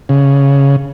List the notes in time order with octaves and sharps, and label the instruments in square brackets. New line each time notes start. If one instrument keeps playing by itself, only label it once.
[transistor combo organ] C#3